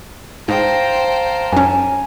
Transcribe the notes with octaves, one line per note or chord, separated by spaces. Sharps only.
G#2 C5 F5 G5 A5 A#5
F#2 C#4 G#5